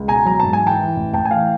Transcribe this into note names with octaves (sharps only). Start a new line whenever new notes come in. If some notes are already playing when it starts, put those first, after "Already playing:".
Already playing: C#2
B2 G#5 A#5
F#3 A#5
G#2 A5
G#5
E3
G5 A5
E3
A1
A1 G5 A5
G#5
E3 F5 G5